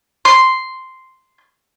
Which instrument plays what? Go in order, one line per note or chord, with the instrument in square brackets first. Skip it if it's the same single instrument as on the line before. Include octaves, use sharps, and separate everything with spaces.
[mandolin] C6